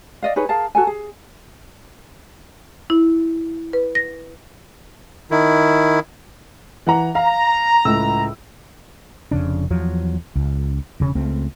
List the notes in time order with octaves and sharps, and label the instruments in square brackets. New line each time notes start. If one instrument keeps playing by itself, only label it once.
[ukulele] D5 D#5 F5
D#4 G#4 B4 C#5
G#4 A#4 F5 A5
F#4 A4 G#5
G#4
[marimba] E4
B4
A#6
[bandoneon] D#3 E4
[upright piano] E3 F#5 A#5
[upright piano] F5 [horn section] A#5
[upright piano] C#2 A2 E6
[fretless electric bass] F1 F2 C#3 D4
E2 F3 F#3
C#2
E1 C#3 C#4
C#2 A3 C4